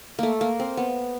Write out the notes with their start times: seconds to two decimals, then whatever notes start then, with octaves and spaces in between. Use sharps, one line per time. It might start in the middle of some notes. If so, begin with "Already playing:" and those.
0.19 A3 A#3
0.41 A#3
0.60 C4
0.77 B3